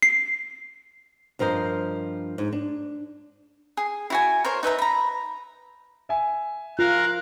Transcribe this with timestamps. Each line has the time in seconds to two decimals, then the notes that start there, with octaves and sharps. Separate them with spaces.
0.02 C7
1.39 G2 F3 A#4 C5 D#5
2.38 G#2
2.53 D4
3.77 G#4
4.10 E4 F#4 G#5
4.45 A#4 C5 C#5
4.63 D#4 B4 E5 A#5
4.79 A#5 B5
6.09 E5 G#5
6.79 F4 A#4 F5 F#6